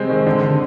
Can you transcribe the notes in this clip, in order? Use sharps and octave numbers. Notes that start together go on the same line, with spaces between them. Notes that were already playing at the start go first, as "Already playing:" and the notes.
Already playing: C3 G3 G#3 C4 C5
D#3
D3
D3